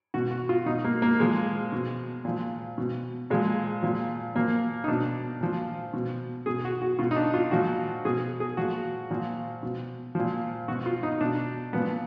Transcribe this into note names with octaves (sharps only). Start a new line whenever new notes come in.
B2 F#4
F#4
F4
B2 D#4
A#3
A#3
A#2 F3 G#3
B2
A#2 F3
B2
A#2 F3 G#3
A#2 F3
A#2 F3 A#3
D#4
B2 D4
A#2 F3
B2
B2 G#4
F#4
F#4
B2 F4
D#4
D4
F4
A#2 F3 F#4
B2 G#4
G#4
A#2 F3 F#4
A#2 F3
B2
A#2 F3
B2 F#4
F4
D#4
B2 D4
A#2 F3 B3